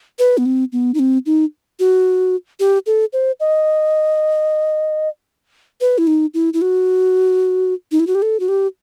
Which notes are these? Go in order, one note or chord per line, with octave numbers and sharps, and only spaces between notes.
B4
B3
C4
B3
D#4
C4
D#4
F#4
G4
A4
C5
D#5
B4
E4
D#4
E4
E4
F#4
D#4
E4
F#4
G4
A4
F#4
G4